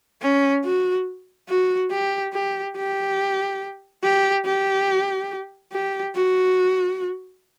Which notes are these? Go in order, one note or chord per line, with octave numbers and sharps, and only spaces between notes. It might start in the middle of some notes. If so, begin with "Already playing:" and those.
C#4
F#4
F#4
G4
G4
G4
G4
G4
G4
F#4